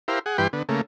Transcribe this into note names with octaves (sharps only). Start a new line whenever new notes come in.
E4 G4 A#4 C5 F5
G#4 F#5
G2 E3 G4 B4 G5 C6
D3 B3
C#3 A3 A#3